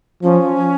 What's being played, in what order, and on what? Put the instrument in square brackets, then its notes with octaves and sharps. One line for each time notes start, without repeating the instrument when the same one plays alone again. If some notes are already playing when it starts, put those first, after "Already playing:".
[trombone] F3 [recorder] C#4